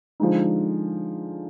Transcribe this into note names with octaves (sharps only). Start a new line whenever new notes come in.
D3 F3 G#3 D#4